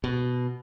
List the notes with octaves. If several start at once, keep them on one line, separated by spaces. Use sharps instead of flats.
B2